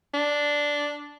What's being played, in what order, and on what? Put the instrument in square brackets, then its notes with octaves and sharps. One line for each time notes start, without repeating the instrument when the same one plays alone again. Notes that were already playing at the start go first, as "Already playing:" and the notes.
[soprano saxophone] D4